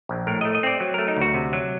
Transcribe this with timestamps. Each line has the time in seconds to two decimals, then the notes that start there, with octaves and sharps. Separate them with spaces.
0.09 A#1
0.27 A2 A#4
0.41 A3 D#5
0.55 D#5
0.63 C4 D5
0.80 F#3
0.94 A3 A#4
1.08 D#4
1.17 D2 F#4
1.34 C3
1.53 F#3